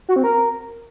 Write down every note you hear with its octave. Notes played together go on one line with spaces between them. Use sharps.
F#4
C4
A#4